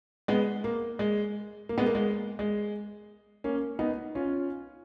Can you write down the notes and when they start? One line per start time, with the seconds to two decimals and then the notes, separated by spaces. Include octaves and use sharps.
0.28 G#3 B3
0.64 A#3
0.99 G#3
1.69 A#3
1.78 G#3 B3
1.86 A#3
1.95 G#3
2.39 G#3
3.44 A#3 C#4
3.79 B3 D#4
4.15 C#4 F4